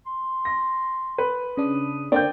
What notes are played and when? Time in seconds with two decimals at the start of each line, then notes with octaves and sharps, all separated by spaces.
0.06 C6
0.45 A#6
1.18 B4
1.57 C#3 D4 D#6
2.12 D3 A#3 C4 D5 G5 G6